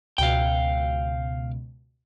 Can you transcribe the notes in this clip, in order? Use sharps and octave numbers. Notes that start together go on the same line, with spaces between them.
C#2 B2 F5 G5